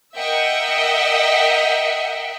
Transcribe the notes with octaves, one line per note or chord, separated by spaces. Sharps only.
A#4 D#5 E5 F#5 G5